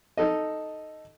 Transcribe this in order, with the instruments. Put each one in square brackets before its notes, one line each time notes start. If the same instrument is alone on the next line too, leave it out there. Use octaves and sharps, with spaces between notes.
[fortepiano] D#4 A4 D#5